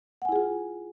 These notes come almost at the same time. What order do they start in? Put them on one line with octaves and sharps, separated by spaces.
F#5 G#5 E4 G#4 F4